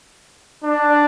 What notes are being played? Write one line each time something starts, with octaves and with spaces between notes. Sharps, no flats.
D4